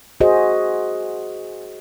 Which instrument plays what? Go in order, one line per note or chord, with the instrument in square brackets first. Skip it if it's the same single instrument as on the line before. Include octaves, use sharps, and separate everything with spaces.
[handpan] F#4 G#4 C5 D#5